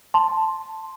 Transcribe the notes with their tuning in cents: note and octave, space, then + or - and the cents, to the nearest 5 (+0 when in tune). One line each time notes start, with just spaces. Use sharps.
A5 +0 C6 +0